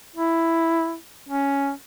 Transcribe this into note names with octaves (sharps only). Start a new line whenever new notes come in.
E4
C#4